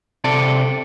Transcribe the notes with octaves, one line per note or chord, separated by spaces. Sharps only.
C3 A4 D5